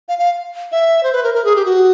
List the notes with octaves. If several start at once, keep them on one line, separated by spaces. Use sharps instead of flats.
F5
F5
E5
C5
B4
A#4
A#4
G#4
G4
F#4